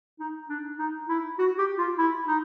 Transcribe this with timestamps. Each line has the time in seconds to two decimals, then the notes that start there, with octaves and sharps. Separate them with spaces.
0.20 D#4
0.49 D4
0.79 D#4
1.09 E4
1.38 F#4
1.58 G4
1.78 F4
1.98 E4
2.27 D#4